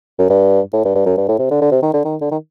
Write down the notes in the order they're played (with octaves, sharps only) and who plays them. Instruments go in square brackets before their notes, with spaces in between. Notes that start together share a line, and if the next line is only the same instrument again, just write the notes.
[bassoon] F#2
G2
A2
G2
G2
F#2
G2
A2
C3
D3
D3
C3
D#3
D3
D#3
D3
D#3